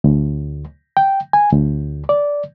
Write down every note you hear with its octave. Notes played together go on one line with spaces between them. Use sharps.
D2
G5
G#5
D2
D5